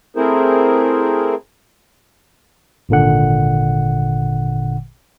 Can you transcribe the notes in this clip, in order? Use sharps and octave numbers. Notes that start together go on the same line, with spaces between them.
A3 C4 E4 G#4 A#4 C5
G#1 A#2 D3 F#5